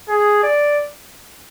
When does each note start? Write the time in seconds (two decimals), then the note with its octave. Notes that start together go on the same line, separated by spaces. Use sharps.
0.09 G#4
0.43 D5